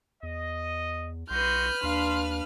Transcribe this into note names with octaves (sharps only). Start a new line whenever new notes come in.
E2 D#5
B1 F#4 B4 D#5 C6 F6 G6
D#2 D4 F5 C6